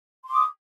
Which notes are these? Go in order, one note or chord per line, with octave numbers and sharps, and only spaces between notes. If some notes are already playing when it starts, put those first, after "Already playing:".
C6 D6 D#6